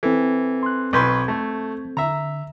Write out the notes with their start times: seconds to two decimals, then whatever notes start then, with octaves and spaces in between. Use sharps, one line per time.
0.03 E3 C4 A4
0.63 C6 F#6
0.93 B1 B4 C6 C#6 G6 G#6
1.28 A3
1.97 D3 E5 A#5